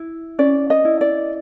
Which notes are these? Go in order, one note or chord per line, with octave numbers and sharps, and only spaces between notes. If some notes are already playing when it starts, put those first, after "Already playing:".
Already playing: E4
C#4 D5
D#5
E4
D5